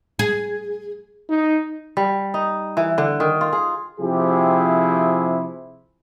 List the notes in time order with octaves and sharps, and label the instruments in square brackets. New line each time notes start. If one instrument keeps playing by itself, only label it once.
[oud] G#4
[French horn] D#4
[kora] G3
D#4
E3
D3
D#3
F4
G#4
[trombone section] C3 F3 E4 G4 G#4